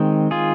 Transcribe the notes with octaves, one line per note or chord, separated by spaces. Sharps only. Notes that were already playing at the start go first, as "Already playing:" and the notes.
Already playing: D#3 G#3 C4
F4 G#4